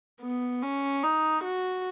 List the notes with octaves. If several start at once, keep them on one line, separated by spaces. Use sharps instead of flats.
B3
C#4
D#4
F#4